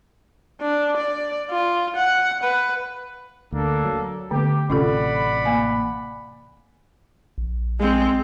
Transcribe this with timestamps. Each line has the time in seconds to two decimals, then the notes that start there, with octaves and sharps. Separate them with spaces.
0.61 D4
0.97 D5
1.50 F4
1.96 F#5
2.43 B4
3.52 D2 A#3 D4 A4
3.85 F#3
4.31 D3 A3 B3 G4
4.70 A1 C3 C#4 F4 A4 D5 F#5 B5
5.45 A#3 F5 G#5
7.38 A#1
7.80 G#3 C4